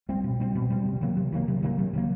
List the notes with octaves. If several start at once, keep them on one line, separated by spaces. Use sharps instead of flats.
G3 C4
B2
G3 C4
B2
G3 C4
C3
D#3 F#3 A#3
C3
D#3 F#3 A#3
C3
D#3 F#3 A#3
C3
D#3 F#3 A#3